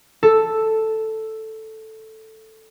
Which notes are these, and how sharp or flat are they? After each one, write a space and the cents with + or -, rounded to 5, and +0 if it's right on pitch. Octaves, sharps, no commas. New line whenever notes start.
A4 +0 E6 +0